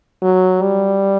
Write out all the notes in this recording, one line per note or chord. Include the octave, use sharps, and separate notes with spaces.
F#3
G3